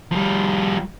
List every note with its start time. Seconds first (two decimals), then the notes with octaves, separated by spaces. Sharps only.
0.12 F3 G3